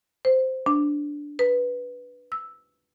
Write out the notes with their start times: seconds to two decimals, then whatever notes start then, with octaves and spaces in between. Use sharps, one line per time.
0.25 C5
0.66 D4
1.39 B4
2.32 E6